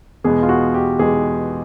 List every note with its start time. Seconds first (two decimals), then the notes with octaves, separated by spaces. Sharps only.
0.24 E2 B2 G#3 B3 G#4
0.43 F4
0.49 F#4
0.74 G4
0.99 E2 B2 G#3 B3 G#4